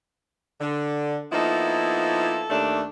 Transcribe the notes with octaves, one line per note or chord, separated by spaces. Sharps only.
D3
F3 A#3 B3 D#4 E4 A4
D#2 A3 D4